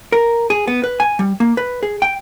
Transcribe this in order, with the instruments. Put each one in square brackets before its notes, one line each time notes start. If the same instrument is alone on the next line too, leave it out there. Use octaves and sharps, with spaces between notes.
[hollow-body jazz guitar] A#4
G#4
B3
B4
G#5
G3
A#3
B4
G#4
G5